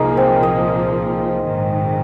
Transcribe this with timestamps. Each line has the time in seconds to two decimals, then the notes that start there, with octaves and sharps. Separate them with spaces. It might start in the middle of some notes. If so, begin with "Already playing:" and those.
Already playing: C2 A#2 F3 A#3 D#4 G#4
0.17 C4
0.43 D#5
1.48 A#1 G#2 D#3